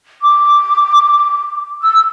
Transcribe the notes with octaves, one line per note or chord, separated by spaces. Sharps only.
D6
E6